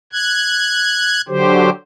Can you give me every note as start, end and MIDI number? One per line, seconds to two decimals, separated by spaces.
0.13 1.21 90
0.13 1.21 92
1.29 1.70 50
1.29 1.70 54
1.29 1.70 67
1.29 1.70 72